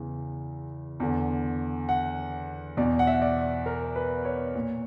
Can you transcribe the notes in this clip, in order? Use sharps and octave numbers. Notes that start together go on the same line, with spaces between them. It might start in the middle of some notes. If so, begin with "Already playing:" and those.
Already playing: E2 C#3 E3
E2 D3
F#5
E2 B2 D5
F#5
E5
F#5
D5
A#4
B4
C#5
A#2